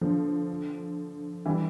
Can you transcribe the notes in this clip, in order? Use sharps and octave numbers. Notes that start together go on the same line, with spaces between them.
D3 F3
E3 G3